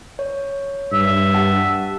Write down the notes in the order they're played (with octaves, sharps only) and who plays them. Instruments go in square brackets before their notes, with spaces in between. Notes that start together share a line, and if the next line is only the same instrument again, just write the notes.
[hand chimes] C#5
[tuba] G2 [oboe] E5
[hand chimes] G4 F#5 A5